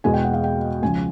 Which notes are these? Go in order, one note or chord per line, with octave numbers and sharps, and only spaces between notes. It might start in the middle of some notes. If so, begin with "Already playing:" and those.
E2 B2 G#3 G#5
G5
F#5
F5
G5
C#2 C#3 F3 G#5